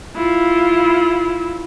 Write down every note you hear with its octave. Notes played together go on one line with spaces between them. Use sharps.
E4 F4